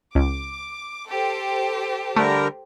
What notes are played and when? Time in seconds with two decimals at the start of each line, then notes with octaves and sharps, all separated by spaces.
0.15 C#2 D6
1.08 G4 A4 C5
2.16 D3 G3 A3 A#4